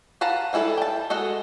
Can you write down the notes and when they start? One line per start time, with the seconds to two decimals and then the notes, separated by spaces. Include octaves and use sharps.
0.21 B4 F5 F#5 A5 A#5
0.53 F3 G3 E4 G#4 A4
0.78 G5 A5
1.10 G#3 F#4 A4 D#5